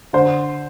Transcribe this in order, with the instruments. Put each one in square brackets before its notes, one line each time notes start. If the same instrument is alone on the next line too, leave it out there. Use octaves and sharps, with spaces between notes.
[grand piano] D3 C5